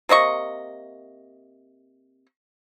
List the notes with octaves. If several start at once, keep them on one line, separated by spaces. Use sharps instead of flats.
C3 A#3 D#5 C#6